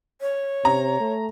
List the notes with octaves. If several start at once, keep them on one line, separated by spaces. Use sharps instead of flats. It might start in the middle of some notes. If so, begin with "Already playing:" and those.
C#5
C3 A#5
A3